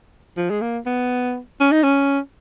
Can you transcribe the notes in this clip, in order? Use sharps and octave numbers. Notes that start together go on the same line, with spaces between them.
F3
G#3
A#3
B3
C#4
D#4
C#4